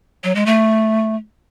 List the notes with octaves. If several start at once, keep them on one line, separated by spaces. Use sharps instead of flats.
F#3
G#3
A3